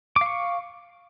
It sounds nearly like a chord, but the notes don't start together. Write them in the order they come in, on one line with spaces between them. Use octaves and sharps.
D6 F5 C#6